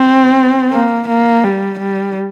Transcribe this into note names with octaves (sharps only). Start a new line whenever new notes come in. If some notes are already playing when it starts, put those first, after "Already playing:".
Already playing: C4
A#3
A#3
G3
G3